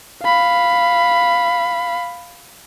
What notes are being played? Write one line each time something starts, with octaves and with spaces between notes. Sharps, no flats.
F5 B5